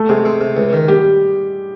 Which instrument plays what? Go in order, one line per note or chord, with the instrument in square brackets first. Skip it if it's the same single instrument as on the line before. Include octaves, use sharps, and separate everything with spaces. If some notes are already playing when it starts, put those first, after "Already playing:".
Already playing: [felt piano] A3 A4
[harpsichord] C3 [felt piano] G#3 G#4
[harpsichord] C4
C3
C#2
D#3
[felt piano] G3 G4